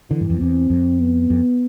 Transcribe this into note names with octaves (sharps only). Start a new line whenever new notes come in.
D3 E3
G2
F2
E2 C4
F2
B3
F2